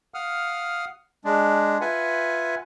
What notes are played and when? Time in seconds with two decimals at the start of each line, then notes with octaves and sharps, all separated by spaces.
0.14 F5 F#5 D#6 F6
1.24 G#3 D4
1.81 F4 B4 E5 F#5 G#5